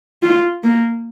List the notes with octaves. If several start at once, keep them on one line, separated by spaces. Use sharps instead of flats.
F4
A#3